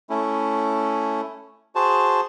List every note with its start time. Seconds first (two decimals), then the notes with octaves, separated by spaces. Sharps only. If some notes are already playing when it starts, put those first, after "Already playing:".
0.10 A3 C#4 E4
1.75 F#4 G#4 C5 A5